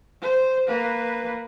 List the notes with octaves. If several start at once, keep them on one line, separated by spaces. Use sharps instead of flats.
C5
A#3 B4